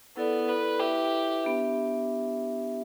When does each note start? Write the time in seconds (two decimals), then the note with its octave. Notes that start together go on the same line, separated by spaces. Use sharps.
0.16 B3 E4 A4 D5
0.49 B4
0.80 E4 G4 B4 E5
1.43 B3 D4 G4 E5